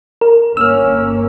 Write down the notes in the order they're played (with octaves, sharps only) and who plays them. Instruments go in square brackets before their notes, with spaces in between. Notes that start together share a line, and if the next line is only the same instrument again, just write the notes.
[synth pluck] A#4
[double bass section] G1 A#3 C#4 [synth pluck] E6 F6